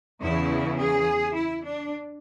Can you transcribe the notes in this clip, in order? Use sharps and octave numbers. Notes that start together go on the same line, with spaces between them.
E2 C#3 E3 E4
G#4
E4
D4